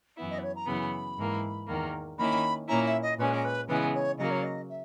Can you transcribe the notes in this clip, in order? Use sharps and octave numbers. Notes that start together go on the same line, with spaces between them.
F#2 E3 B3 E4
D#5
B4
C#5
A#5
F#2 C#3 E3 B3 B5
G#2 E3 A#3
E2 D#3 A#3
D#3 A#3 C#4 E4 B5
A#2 A#3 C#4 E4 A#5
E5
D#5
A#2 G#3 C#4 B4
A#4
B4
C#3 E3 G#3 B3 B4
C#5
C#3 F#3 A#3 D#5
C#5
D#5
E5